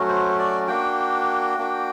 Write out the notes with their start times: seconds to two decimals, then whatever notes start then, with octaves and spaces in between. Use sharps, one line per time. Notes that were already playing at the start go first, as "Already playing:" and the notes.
Already playing: F#3 A3 C#4 F#4
0.08 C5
0.39 D5
0.68 A#3 D4 F#4 G5
1.58 A#3 D4 F#4